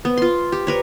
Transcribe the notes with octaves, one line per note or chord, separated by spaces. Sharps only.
B3
F4 C6
G4
A#4 B4 C#5